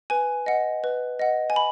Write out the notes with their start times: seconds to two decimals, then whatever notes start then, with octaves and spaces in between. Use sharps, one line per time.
0.10 B4 G#5
0.46 D#5 F#5
0.84 B4
1.19 D#5 F#5
1.50 G#5
1.56 B5